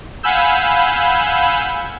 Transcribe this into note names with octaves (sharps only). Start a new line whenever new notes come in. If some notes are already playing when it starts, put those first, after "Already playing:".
F5 F#5 G#5 B5 E6 G6